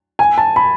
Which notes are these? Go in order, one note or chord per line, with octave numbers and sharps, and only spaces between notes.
G#5
A5
B5